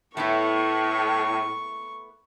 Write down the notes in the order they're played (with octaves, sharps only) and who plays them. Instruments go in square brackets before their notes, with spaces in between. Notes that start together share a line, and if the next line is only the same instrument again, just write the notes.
[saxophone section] A2 [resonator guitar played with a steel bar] A3 B3 E4 [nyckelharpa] C#6